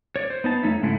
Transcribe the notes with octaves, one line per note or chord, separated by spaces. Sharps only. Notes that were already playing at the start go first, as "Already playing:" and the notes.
C#5 D5
C5
B3 D#4 A5
F2 A3 D#4 C#5 E5
G#2 C#3 G#3 A3 E4